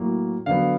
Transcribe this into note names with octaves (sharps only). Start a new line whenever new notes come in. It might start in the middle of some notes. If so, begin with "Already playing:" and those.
Already playing: A2 F#3 A#3
D3 F#3 B3 F5